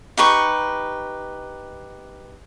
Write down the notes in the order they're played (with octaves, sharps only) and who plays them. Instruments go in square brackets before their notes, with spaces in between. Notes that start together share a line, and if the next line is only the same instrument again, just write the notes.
[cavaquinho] D#4 G4 B4 C#6